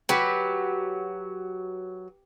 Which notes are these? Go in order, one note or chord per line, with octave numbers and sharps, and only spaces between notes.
F#3 G4 B4